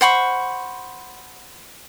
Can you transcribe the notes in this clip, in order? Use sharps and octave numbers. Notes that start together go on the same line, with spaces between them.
C5 F#5 B5 C#6